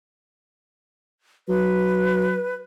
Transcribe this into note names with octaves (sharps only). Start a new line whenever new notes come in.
F#3 B4